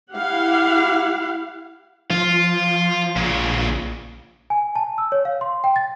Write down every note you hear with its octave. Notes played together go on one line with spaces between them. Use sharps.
E4 G4 F5 F#5
F3 F4
A#1 A#2 C#3
G#5
A5
E6
C#5
F5
C6
G5
A6